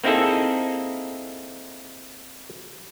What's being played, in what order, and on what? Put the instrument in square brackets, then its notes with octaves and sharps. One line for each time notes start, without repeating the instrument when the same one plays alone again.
[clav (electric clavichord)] A#3 C4 D#4 E4 G#4 A4